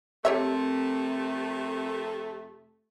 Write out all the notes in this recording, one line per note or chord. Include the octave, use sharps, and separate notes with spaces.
F2 C3 A3 C4 G4 A#4 C#5 E5